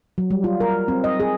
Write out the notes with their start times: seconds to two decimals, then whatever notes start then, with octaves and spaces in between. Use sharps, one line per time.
0.18 F#3
0.31 G3
0.44 F4
0.60 A#4
0.88 C4
1.04 D#5
1.20 G#4